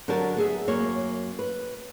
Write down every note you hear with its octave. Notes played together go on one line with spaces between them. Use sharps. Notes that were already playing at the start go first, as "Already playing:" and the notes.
D3 F#3 G4 A#4 C#5 A5
B3 G#4 E5
F#2 A#3 C#5
B4